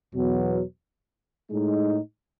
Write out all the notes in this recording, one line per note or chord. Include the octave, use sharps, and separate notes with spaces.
E2 B2 F#3 B3
A2 G#3 D#4